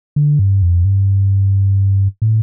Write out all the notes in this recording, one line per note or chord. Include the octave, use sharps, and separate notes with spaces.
D3
G2
F2
G2
A2